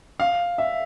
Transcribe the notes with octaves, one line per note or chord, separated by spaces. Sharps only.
F5
E5